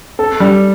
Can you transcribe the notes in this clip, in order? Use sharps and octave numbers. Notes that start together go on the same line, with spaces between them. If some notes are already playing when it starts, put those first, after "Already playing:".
A4
G3